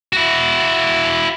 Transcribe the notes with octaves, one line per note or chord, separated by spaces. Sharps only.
E4 F#4